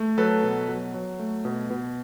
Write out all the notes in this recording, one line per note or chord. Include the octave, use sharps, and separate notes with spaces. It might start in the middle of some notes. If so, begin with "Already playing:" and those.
Already playing: A3
F#3 A4 B4
B2
F#3
F#3
A3
B2
B2